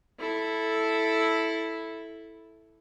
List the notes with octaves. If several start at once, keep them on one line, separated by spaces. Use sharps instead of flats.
E4 A4